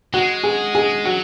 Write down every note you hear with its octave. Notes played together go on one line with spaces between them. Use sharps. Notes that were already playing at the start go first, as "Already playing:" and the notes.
G#3 F#4
G#4
G#4
F#3 F#4